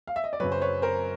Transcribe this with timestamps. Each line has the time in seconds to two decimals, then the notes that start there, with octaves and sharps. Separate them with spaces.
0.07 F5
0.16 E5
0.24 D#5
0.33 D5
0.40 F#2 C#3 F#3 B4 C#5
0.52 C5
0.62 B4 C#5
0.82 A#4 C5